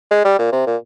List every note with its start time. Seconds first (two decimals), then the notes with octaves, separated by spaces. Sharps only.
0.11 G#3
0.25 G3
0.39 A#2
0.52 C3
0.67 A#2